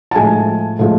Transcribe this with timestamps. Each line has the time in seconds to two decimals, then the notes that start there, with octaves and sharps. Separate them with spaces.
0.11 A5
0.15 A2 F3 G#3 G#5
0.79 A2 F3 G#3